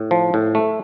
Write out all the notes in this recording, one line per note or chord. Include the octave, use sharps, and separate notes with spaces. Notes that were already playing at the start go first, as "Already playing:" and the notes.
Already playing: A2
F3
A2
A3